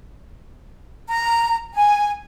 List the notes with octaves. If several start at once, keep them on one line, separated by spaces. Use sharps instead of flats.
A#5
G#5